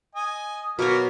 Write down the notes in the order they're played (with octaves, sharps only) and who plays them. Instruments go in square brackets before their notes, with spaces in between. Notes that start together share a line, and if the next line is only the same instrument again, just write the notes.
[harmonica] D#5 G#5
[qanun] B2 C#5 [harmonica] F#3 A#3 F6